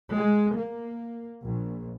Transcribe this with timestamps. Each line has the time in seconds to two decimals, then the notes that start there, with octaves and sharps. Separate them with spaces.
0.14 G#3
0.55 A#3
1.47 A#1